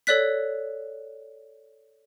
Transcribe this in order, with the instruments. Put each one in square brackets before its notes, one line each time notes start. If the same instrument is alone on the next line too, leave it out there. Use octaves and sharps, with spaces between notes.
[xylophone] A4 C#5 D5 F#6 B6